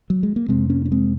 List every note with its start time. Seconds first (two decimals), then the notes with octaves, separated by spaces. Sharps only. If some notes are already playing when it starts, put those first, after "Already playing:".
0.10 F#3
0.23 G#3
0.36 A#3
0.48 F2 C3 G#3 C4
0.69 A#3 C#4
0.85 C#4
0.92 G#3 C4